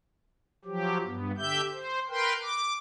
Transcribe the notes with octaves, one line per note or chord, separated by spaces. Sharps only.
F3 F#3 G4
G2 B3
D3 G4 E5 G6
C5
A#4 B4 G5 C6
D6